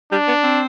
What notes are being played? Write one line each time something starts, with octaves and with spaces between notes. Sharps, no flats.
G3 D4
B3
C4